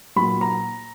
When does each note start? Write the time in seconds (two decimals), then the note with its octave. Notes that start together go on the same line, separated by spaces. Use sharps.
0.16 A#2 F#3 B5
0.41 A#5